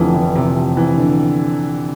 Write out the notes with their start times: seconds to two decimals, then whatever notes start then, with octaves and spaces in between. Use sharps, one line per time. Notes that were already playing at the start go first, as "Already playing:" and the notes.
Already playing: F1 F2 D3 E3 F3
0.14 E3
0.36 C3
0.77 E3
0.98 D3